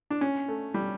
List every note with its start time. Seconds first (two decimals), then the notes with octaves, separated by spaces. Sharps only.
0.10 D4
0.21 C#4
0.48 A3
0.74 G3